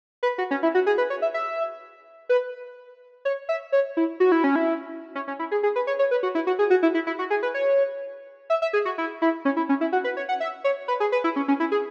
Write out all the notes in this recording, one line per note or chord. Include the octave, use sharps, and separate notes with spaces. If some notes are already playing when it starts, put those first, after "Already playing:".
B4
F#4
C#4
E4
F#4
G#4
B4
C#5
E5
E5
B4
C#5
E5
C#5
E4
F#4
E4
C#4
E4
C#4
C#4
E4
G#4
G#4
B4
C#5
C#5
B4
F#4
E4
F#4
G#4
F#4
E4
E4
E4
F#4
G#4
B4
C#5
E5
E5
G#4
F#4
E4
E4
C#4
E4
C#4
E4
F#4
B4
C#5
F#5
E5
C#5
B4
G#4
B4
E4
C#4
C#4
E4
G#4